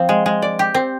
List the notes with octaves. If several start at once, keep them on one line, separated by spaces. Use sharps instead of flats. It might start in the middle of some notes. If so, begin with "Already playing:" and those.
Already playing: F3 C4
G#3
G#3
D5
G4
C4